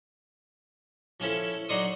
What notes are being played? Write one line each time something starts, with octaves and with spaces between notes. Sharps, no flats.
F3 C#4 E4 A4
F#3 D#4 D5 C6 C#6 D#6